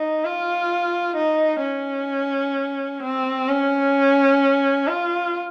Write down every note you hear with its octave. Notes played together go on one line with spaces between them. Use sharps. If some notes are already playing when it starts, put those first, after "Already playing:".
Already playing: D#4
F4
D#4
C#4
C4
C#4
F4